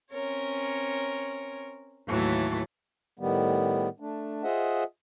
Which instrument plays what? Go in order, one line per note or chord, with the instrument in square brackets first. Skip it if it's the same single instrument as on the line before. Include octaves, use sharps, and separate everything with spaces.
[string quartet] C4 C#4 A#4 C#5
D#2 A2 E3 F#3 A3
[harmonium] A2 D#3 G3 B3
A3 D4
F4 G#4 C5 D#5 E5 F#5